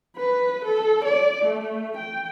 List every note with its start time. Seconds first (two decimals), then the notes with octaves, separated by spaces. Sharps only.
0.16 B4
0.65 A4
1.05 D5
1.45 A3
1.97 G5